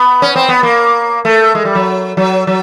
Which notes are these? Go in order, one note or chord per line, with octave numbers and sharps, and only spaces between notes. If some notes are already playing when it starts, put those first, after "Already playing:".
Already playing: B3
C#4
C4
B3
A#3
A3
G#3
G3
F#3
F#3
F#3